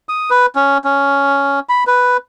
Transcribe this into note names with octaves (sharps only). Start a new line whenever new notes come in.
D#6
B4
C#4
C#4
B5
B4